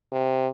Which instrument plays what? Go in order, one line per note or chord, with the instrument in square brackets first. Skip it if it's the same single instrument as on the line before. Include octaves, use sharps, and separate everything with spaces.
[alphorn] C3